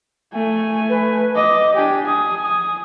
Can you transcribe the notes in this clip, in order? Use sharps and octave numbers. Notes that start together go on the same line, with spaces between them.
A3 G#5
B4
D#5 D6
D4 G4 G#5
G#5 D#6
D#6